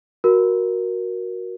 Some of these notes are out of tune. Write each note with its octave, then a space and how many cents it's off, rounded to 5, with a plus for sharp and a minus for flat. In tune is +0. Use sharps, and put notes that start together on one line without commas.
F#4 -5 A#4 +10